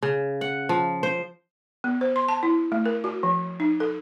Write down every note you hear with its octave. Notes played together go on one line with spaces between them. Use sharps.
C#3
F#5
F3
C5
B3
C5
C6
A5
E4
A3
A#4
F#4
F3
D#4
A4